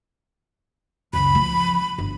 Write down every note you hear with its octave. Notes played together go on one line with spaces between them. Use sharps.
C#2 F#2 B5
F3
G1